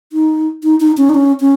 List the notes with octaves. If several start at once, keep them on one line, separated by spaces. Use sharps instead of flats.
D#4
D#4
D#4
C#4
D#4
C#4
C#4